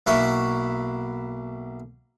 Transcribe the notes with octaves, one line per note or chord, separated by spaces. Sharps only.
B1 A#3 E4 F#4 E5 C#6